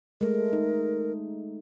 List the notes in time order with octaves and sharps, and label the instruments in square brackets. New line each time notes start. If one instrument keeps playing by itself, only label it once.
[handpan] G#3 A3 [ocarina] A#4
[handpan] D#4